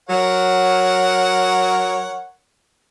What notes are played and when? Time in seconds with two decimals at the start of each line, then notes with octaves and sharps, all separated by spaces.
0.09 F#3 A#4 C#5 F#5